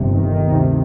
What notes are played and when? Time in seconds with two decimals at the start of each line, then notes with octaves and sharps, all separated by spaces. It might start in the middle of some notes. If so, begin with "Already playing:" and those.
Already playing: G1 F2 C3
0.14 D#3
0.43 D2 C3